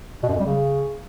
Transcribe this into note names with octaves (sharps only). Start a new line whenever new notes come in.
B2
F#2
F2
G3
C#3